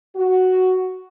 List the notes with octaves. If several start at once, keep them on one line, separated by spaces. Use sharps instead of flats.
F#4